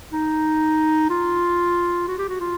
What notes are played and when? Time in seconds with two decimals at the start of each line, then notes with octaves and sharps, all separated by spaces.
0.12 D#4
1.10 F4
2.08 F#4
2.18 G4
2.29 F#4
2.41 F4